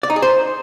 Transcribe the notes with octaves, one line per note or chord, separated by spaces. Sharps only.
D5
D#4
G#4
C5